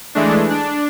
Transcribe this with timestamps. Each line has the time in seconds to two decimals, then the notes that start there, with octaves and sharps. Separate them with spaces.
0.15 E3 G#3 A3 D4
0.50 D4